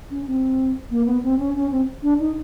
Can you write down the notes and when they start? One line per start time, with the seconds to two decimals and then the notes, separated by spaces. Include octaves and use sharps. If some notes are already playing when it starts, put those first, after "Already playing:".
0.10 C#4
0.26 C4
0.90 A#3
1.06 B3
1.23 C4
1.38 C#4
1.55 C#4
1.71 C4
2.02 D4
2.19 D#4